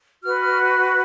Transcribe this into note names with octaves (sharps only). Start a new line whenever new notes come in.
F#4 B4 F6
F6